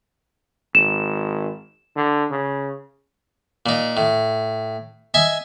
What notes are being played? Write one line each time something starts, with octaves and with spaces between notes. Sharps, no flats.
G#1 E7
D3
C#3
A#2 D#4
A2
D#5 E5 G#5